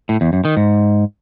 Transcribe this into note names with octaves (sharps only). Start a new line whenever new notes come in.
A2
E2
F#2
D#3
G#2